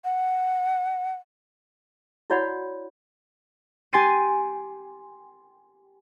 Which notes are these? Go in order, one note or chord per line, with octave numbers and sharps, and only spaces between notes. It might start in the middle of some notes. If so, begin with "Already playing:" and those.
F#5
E4 F#4 C#5 D5 F#5 B5
G4 G#5 C6 A6 C7 D#7